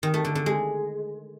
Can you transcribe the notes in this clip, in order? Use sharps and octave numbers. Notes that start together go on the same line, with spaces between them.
D#3
A3
D3
D3
G#3